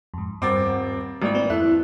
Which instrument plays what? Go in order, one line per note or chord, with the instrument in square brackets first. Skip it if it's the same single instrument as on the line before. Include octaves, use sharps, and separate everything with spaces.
[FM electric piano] F2 G#2
[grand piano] D#1 C4 D6 [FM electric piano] G2 F#5 A6
[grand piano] G#1 [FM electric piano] A3 A#3 E4 [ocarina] D5
[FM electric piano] A#3 C4 B4
[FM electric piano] F2 A4 F#6 [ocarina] E4 [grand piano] E5